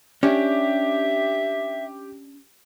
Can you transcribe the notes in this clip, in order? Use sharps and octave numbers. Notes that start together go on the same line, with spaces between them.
C#4 D4 G4 E5